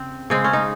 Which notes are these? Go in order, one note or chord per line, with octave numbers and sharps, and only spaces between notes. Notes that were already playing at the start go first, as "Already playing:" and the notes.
Already playing: C#3 C4
C#3 G#3 C4
C#4
D#4